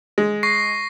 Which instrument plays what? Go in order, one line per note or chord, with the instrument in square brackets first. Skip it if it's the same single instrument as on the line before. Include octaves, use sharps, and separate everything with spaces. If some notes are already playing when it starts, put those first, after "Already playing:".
[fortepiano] G#3
[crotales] C#6 A#6 C7